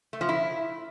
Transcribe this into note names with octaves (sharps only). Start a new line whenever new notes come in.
A3
F3
E4